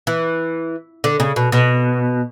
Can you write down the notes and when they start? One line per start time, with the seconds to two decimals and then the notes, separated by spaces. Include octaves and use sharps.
0.07 E3
1.04 D3
1.20 C#3
1.36 B2
1.52 B2